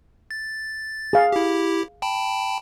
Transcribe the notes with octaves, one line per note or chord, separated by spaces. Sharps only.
A6
G#4 F5
E4 G4
G5 A5 B5